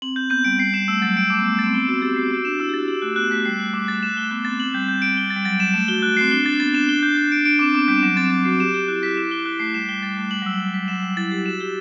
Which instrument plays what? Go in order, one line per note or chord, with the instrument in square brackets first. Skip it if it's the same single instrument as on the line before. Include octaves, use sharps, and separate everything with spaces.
[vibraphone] C4 [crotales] F#7
[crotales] G6
[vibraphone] B3 [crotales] G6
[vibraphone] G3 [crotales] D7
[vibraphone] G3 [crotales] C7
[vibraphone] G3 [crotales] E7
[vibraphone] A3 [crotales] E6
[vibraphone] F#3 [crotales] A6
[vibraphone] G3 [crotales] D7
[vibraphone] A3 [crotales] D6
[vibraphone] B3
[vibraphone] A3 [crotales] D6
[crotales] A6
[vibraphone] C4
[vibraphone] B3 [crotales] G7
[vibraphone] F#4 [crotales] A6
[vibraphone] G4 [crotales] A6
[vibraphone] F#4 [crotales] C7
[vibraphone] F#4 [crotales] C7
[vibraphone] D4 [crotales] E7
[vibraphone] E4 [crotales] E6
[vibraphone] G4
[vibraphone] F#4 [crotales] A6
[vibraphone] G4 [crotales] F#7
[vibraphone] A3 [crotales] F#6
[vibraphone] B3 [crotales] F#6
[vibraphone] A3 [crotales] B6
[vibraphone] G3 [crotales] C7
[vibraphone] A3 [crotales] F#7
[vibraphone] G3 [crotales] D6
[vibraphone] A3 [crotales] A6
[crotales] E7
[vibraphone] A3 [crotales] G7
[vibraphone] B3 [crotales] F#6
[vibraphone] C4 [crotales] A6
[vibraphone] C4 [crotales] F#7
[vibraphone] G3 [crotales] G6
[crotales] G6
D7
G7
A6
[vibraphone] G3
[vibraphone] F#3 [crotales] A6
[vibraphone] G3 [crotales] E7
[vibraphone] A3 [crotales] E7
[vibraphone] F#4 [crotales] G7
[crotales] F#6
[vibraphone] C4 [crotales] C7
[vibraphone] D4 [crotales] G7
[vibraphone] D4 [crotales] A6
[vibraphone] B3 [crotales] A6
[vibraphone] D4 [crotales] E7
[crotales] G7
G6
G6
D7
[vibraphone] D4 [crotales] D7
[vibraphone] C4 [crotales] D6
[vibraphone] B3 [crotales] D6
[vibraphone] G3 [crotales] G6
[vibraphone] F#3 [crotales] E7
[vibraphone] C4 [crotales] A6
[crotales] A6
[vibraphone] F#4 [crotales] C7
[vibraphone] G4 [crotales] E7
[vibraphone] G4 [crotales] G7
[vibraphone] E4 [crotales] F#6
[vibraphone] E4 [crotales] B6
[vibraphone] E4 [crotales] E7
[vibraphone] E4 [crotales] G7
[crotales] F#6
[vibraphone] A3 [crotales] C7
[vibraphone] G3 [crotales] E7
[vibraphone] G3 [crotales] G7
[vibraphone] G3 [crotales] A6
[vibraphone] A3 [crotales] C7
[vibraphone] G3 [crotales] F#7
[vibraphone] F#3 [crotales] E6
[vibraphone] G3
[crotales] E6
B6
[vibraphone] F#3 [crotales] E7
[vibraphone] G3 [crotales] G7
[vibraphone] E4 [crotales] A6
[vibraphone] G4 [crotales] C7
[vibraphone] F#4 [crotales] E7
[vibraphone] G4 [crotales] G7